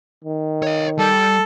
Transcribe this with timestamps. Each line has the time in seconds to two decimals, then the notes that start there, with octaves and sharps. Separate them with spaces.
0.24 D#3
0.63 C#5 D#5
0.98 G3 A4